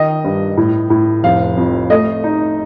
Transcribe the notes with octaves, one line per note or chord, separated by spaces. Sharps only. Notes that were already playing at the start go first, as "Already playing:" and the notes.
Already playing: D#3 D#5
G2
A2
A2
F1 F5
F2
A3 D#5
D#4